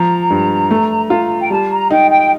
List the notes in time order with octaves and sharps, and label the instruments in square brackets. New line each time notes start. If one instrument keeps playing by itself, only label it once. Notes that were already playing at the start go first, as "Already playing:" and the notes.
Already playing: [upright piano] F3 [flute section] A#5
[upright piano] G2
A3
F4
[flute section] G5
[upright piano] G3 [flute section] A5
[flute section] A#5
[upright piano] D#4 [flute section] G5
[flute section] G5